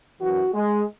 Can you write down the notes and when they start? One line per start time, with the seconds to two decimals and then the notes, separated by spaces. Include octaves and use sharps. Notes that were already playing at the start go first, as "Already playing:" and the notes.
0.21 F#2 E3 F#4
0.53 G#3